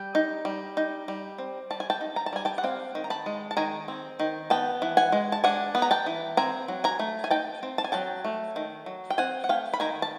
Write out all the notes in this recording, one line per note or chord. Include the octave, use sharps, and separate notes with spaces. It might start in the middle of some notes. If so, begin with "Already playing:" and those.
Already playing: G3 G5
D#4
G3
D#4
G3
C4
G3 A5
G#5
G5 A5
D#4
A#5
A5
G3 G#5
G5 A5
F#5
C4 F5 G5
D#3
A#5
A5 B5
G#3
A5
D#3 G#5 A#5
C4
D#3
B3 G5 A5
E3
F#5 G#5
G#3
A5
D4 F#5 G#5
B3
A#5
G5 A5
E3
C4 G#5 A#5
F#3
G#5 A#5
A3
G#5
D#4 G5 A5
C4
A5
G#5
F#3 G5 A5
A3
D#3
F#3
G5
C4 F#5 G#5
F#5
A3 F5 G5
B5
D#3 G#5 A#5
A5